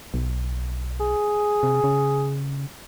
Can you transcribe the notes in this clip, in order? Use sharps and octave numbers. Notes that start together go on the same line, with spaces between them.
B1
G#4
C3
C#3